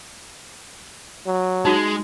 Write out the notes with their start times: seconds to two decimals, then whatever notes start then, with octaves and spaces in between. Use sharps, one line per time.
1.27 F#3
1.65 G#3 D#4 F#4